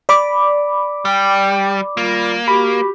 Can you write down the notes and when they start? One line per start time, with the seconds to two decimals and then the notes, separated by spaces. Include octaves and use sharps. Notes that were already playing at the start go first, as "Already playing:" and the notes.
0.09 D5 B5 D6
1.05 G3 G5
1.97 D#3 G3 A#3 F4
2.48 F#4 G4 B5